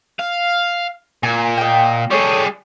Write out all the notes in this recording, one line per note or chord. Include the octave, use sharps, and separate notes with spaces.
F5
A#2 G#5
D#5 G5
G3 G#4 A4 C#5